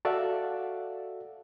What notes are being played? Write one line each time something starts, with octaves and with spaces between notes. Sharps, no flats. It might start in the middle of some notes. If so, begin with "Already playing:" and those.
F#4 A4 D5 E5 F5 E6